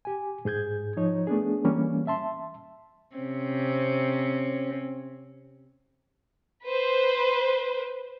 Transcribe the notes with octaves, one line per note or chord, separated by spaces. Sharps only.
G4 G#5
G#2 G#4 G6 G#6
F3 D#4 C#5
A3 B3 D4 G#4
E3 G3 A#3 C#4
E5 A5 C6
C3 C4 C#4
B4 C5